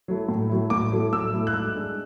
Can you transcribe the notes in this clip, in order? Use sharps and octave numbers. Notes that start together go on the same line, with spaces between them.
F#3 A3 E4
A2
F#3 A3 E4
A2 D6
F#3 A3 E4
A2 E6
F#3 A3 E4
F#6
G#2 E6
G#3 D4